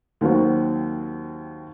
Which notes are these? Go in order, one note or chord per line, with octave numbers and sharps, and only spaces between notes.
D#2 D#3 F#3 C4 F#4